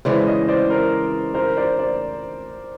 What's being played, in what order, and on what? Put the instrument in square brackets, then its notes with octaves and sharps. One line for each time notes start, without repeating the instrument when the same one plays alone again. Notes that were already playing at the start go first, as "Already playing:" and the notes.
[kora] C#3 E3 G#3 [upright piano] C5 D5
[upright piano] C#5 D#5
C5 D5
A#4 C5
A#4 C5
C5 D5
C5 D5